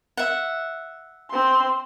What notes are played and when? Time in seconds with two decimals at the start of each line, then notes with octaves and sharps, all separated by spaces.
0.17 E5 F#5
1.30 C4 C6